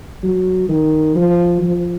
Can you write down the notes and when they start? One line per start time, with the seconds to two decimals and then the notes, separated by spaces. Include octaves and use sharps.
0.23 F#3
0.69 D#3
1.15 F3
1.62 F3